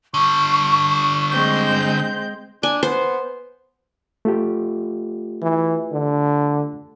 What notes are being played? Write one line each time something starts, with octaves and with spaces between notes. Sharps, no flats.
D3 G3 C#6
G#3 C4 G6
D4 G#5
B3 C5
A3 F4 G4
E3
D3